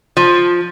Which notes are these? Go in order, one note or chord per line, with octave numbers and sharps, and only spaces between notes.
F3